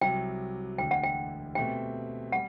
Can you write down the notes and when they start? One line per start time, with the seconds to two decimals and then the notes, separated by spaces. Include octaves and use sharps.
0.01 C2 C3 F#3 G5
0.78 E1 D2 D3 G5
0.91 F#5
1.04 G5
1.55 B2 A3 C4 G4 G5
2.32 G3 F#5